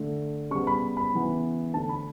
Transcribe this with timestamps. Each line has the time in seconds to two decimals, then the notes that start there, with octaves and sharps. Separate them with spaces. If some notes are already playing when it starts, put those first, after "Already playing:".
Already playing: D3 A3
0.51 C#3 G3 B3 C#6
0.67 B5
0.97 B5
1.13 C#3 E3 B3
1.74 D3 A3 A5
1.89 B5